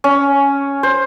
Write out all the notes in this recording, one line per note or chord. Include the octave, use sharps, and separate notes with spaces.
C#4
C5